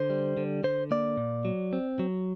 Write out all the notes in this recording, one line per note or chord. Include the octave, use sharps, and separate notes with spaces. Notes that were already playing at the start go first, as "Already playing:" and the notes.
Already playing: D3 C5
G3
D3
D3 C5
A#3 D5
A#2
F#3
C4
F#3